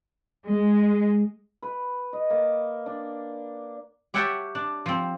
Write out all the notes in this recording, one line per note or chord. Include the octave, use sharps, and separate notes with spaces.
G#3
B4
D#5
A#3
D4
G4 C#5 E5 F#5 G5 A5
D4
F3 C4